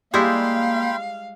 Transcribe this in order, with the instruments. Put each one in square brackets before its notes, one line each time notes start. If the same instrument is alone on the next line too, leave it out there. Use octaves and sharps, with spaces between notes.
[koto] G3 G#3 E4 [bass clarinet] A#3 [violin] F5 [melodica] G5 B5 C6